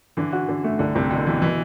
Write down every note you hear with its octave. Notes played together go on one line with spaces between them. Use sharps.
D3 E3
F#4
D3
A3
C2 D3
C2 C3
B2 D3
B2 E3
B2 E3